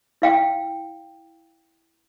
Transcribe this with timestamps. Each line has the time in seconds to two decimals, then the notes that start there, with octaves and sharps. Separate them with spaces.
0.22 E4 F5 G5